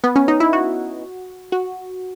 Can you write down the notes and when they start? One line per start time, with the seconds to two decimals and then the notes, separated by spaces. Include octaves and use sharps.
0.04 B3
0.16 C#4
0.28 D#4
0.40 E4
0.53 F#4
1.52 F#4